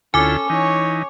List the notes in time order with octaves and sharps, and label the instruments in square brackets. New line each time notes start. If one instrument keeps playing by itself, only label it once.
[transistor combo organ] D2 E4 F4 [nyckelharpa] C#4 A4 [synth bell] G#5 D6
[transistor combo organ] E3 D#4 [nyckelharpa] C#5